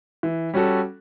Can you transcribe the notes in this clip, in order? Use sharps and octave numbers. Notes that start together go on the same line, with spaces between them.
E3
G3 C#4 F#4 A4